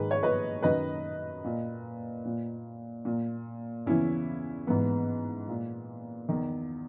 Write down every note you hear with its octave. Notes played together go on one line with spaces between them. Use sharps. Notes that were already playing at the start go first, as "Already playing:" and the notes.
Already playing: G#2 D#3 G#4 B4
C#5
B4 D#5
F#2 D#3 B4 D#5
A#2
A#2
A#2
E2 C#3 E3 C#4 E4
G#2 E3 B3
A#2
E2 D#3